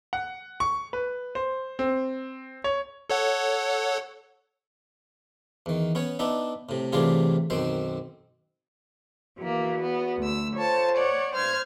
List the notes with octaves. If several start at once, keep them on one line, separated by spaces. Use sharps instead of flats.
F#5
C#6
B4
C5
C4
C#5
A4 C#5 F#5
E2 D#3
B3 C#4 C#5
B3 D4 D#4 E5
A2 C3
A2 C3 E3 D4 F4 G#4
B1 F#2 D#3 C4 C5
E2 E3 A#3 F#4
B3
D2 E6
F4 A4 C5 C#5 A5
C#5 D5 F#5
G2 C5 F6 G#6